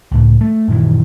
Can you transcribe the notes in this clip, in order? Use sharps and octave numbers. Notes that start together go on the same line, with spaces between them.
C#2 A2
A3
F#2 A#2 D#3 E3